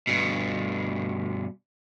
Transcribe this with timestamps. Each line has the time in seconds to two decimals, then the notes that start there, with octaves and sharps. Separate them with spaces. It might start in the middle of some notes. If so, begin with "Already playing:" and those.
0.07 G2 B2